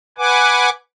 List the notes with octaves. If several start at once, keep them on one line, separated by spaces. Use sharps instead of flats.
B4 F#5 G#5 D6